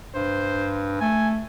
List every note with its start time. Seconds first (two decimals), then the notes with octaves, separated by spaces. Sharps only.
0.15 G2 C5
1.00 A3 G#5